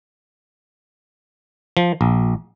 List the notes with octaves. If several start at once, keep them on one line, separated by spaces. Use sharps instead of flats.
F3
A#1